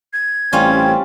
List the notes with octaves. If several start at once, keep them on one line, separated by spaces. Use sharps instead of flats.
G#6
A1 G3 C4 C#4 F4